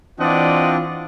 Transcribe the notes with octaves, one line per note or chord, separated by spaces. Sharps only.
E3 C4 D4 F4 D5 D#5 F#5